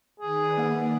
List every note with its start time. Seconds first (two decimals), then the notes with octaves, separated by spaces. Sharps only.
0.20 D#3 G#4 B4 D5
0.58 A#3 F#5